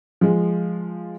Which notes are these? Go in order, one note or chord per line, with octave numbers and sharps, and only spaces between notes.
F3 G#3